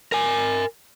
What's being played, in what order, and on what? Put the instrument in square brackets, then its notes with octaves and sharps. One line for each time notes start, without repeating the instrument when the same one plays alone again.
[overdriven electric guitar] A#4 G#5